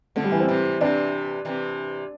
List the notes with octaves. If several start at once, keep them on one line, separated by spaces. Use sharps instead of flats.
D3 F3 A3
G3
E3
C4
C3 E3
C3 E3 D4
C3 E3